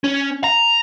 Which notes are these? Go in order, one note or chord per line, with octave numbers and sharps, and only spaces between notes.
C#4
A#5